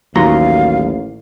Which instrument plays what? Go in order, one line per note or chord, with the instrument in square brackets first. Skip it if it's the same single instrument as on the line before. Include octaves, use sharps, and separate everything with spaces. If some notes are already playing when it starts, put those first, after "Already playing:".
[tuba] A1 [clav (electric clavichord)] D#2 A#5 [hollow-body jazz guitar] F#3 F#4 C6 [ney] F5